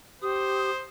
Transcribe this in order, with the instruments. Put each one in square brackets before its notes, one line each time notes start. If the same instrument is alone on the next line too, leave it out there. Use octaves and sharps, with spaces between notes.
[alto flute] G4 [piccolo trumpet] C5 [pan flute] D#6